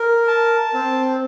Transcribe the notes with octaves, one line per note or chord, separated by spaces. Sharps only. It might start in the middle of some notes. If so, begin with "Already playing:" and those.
Already playing: A#4
A5
C4